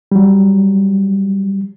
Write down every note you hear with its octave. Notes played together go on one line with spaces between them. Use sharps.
F#3 G3